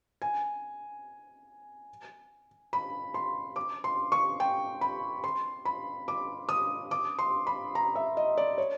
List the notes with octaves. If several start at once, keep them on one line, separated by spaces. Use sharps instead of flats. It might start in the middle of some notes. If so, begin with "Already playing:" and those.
G#5
B5
C6
D6
C6
C#6
G5
B5
C6
B5
D6
D#6
D6
C6
B5
A#5
E5
D#5
D5
C#5